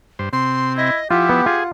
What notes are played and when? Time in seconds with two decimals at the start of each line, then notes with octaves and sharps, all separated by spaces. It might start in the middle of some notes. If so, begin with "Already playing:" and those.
0.19 G2 C5
0.33 C3 C4 C6
0.77 E4 D#5
1.11 F3 E4 F4 G4 F#5
1.29 B3
1.46 F4 G#4